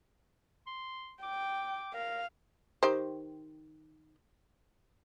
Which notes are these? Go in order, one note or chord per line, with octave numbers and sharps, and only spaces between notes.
C6
G5 D6
A#4 F5
D#3 G4 C5